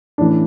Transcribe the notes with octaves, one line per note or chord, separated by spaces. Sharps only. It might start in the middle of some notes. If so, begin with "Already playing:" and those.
A1 A2 E3 D4